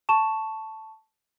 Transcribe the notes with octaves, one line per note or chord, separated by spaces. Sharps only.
A5 C#6 E7